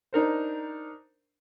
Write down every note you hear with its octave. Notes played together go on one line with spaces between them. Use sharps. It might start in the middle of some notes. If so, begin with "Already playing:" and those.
D4 D#4 A#4 C5